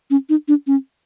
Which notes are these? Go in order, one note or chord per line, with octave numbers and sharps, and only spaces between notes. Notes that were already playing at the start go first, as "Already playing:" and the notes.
C#4
D#4
D4
C#4